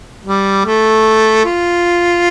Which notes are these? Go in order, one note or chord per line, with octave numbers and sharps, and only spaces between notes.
G3
A3
F4